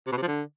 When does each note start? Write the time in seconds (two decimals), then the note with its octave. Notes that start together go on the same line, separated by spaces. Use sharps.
0.07 C3
0.12 B2
0.17 C3
0.22 F3
0.27 D3